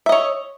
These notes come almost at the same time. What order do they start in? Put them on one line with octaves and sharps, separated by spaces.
E5 D#5 C#5